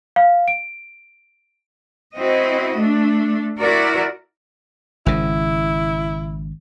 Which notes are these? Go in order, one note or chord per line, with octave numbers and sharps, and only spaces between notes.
F5
D7
C4 E4 F#4 D#5
A3 D4
E4 F#4 A#4 D5
G#1 C#3 E4